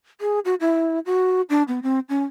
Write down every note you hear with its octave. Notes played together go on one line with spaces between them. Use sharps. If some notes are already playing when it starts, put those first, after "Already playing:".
G#4
F#4
E4
F#4
D4
B3
C4
C#4